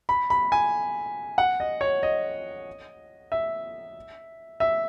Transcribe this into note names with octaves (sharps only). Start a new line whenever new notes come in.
B5
B5
G#5
F#5
D#5
C#5
D#5
E5
E5